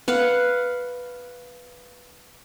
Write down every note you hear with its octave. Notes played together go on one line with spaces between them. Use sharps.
B4 F5 F#5